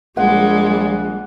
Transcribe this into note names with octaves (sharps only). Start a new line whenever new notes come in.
A#1 G3 G#3 F#5